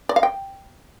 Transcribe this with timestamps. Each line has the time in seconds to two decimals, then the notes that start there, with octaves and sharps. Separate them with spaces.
0.09 D5
0.16 F5
0.23 G5